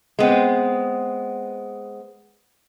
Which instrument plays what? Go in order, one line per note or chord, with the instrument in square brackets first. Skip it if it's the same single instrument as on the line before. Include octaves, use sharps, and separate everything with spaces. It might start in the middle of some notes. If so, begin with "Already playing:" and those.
[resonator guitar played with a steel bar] G#3 B3 C4